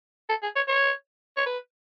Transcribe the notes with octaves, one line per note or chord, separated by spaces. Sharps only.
A4
G#4
C#5
C#5
C#5
B4